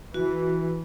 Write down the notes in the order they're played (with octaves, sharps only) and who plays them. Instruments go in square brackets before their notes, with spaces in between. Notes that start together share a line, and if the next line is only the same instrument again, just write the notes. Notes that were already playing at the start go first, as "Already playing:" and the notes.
[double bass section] E3 [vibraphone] F#4